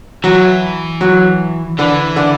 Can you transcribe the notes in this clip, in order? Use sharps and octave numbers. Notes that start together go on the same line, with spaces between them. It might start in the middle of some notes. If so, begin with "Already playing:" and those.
E3 F#3
F#3
D3 E3
D3